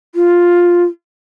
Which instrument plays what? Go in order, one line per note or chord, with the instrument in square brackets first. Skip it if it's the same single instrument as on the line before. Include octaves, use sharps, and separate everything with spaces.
[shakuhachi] F4